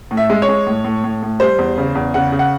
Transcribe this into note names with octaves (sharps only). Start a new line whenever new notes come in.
A2
E5
G#3
C#5
G#3
A2
A2
A2
A2
G3 C5
E2
C#3
E2
C#3 F#5
C#3
F#5